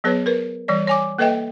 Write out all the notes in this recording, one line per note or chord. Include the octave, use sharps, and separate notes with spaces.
F#3 B3 G#4 B4 C#5
A#4 B4
E3 G3 C#5 D5
C#5 G#5 D6
A#3 A4 B4 D#5 E5 G5